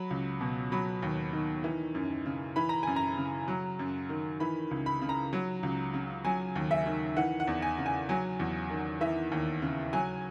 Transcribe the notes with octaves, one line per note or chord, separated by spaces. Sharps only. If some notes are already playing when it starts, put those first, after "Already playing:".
Already playing: F#3 B5
C#2
B2
F#3 B5
D#2
D#3
E3
F#2
C#3
E3 B5
A#5
F#2 G#5
A#5
C#3
F#3
F#2
D#3
E3 B5
C#2
B5
C#3
A#5
F#3
C#2
C#3
F#3 G#5
D#2
E5
D#3
E3 F#5
F#5
E2
G#5
C#3
G#5
F#3 G#5
E2
D#3
E3 E5
D#2
C#3
F#3 G#5